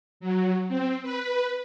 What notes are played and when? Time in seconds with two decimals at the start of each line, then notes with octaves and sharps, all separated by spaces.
0.20 F#3
0.69 C4
1.03 B4